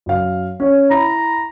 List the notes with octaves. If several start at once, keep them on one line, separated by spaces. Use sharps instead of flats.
F#2 F5
C#4 C#5
E4 A#5 B5